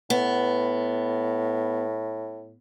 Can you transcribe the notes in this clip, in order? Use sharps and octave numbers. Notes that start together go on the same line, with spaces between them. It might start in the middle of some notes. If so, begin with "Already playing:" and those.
A2 B3